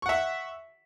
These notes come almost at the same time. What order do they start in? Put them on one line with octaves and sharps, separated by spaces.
C#6 F#5 E5